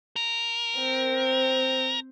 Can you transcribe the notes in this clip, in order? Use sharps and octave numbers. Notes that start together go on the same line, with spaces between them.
A#4
C4